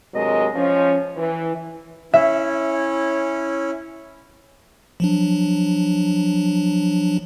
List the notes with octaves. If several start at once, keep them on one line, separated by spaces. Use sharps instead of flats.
G2 C3 F#3 G#3 A#4 D#5
F3 C#4
E3
C#4 E4 E5
F3 F#3 D4